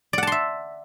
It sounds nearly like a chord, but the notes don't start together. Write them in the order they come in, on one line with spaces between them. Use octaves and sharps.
D5 F#5 A5 C6 E5